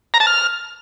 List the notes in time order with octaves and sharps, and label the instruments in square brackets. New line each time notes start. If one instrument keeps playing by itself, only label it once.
[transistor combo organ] A#5
A5
F6